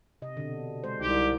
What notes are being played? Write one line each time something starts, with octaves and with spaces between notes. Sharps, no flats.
C3 D#5
B2 D3
G#3 C5
C2 D#4 G4